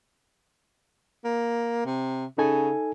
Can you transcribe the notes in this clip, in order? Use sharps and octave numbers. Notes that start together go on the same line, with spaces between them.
A#3
C3
C#3 D#4 A4 G#5